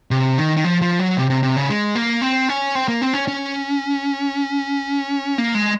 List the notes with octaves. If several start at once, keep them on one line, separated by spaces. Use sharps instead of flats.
C3
D#3
D#3
F3
F3
F#3
C3
C3
C3
C#3
G#3
A#3
C4
C#4
C4
A#3
C4
C#4
C#4
A#3
G#3